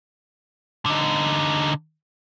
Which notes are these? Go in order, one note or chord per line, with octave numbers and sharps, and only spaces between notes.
D3 D#4